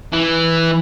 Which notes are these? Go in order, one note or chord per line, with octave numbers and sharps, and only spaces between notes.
E3